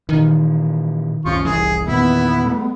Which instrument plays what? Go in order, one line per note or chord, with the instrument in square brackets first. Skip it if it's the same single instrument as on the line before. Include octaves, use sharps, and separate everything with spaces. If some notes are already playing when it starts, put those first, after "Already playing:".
[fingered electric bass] A#2 E3 [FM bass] D#3
[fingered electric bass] C2 F#2 C#4 [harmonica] F3 F4 C#6
[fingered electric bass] F1 C2 G3 [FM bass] E3 [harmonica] G#4
[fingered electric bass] E2 A#2 D#3 [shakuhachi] B3 [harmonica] E4
[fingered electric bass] G3 A3